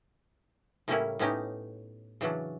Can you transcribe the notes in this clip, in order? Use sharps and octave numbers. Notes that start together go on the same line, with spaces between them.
A2 C#3 G3 A#3 C#4 E4
A2 B3 C#4 D#4 G4
C#3 E3 F#3 C#4 D4